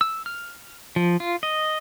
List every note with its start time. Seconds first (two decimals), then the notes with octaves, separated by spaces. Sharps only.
0.01 E6
0.26 F6
0.96 F3
1.20 F4
1.43 D#5